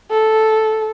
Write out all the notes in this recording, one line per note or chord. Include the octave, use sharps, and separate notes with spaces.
A4